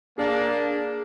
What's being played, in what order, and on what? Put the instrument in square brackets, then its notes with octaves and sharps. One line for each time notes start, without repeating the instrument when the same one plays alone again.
[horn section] A#3 D4 [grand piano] G#4